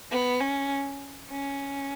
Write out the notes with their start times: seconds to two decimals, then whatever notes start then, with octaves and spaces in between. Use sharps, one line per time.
0.11 B3
0.40 C#4
1.30 C#4